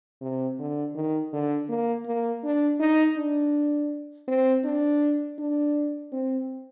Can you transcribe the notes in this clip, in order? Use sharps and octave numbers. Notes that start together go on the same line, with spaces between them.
C3
D3
D#3
D3
A#3
A#3
D4
D#4
D4
C4
D4
D4
C4